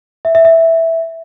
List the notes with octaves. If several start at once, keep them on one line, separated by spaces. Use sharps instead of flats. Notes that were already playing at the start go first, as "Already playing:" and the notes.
E5
E5
E5